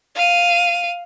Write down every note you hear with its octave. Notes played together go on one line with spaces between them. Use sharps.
F5 D#7